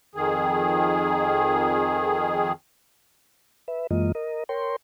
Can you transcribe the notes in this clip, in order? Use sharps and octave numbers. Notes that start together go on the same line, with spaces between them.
F2 D#3 G#4
B4 E5
F#2 E3 G#3 A#3 F4 D#5
A#4 D#5
A#4 C#5 G5 C6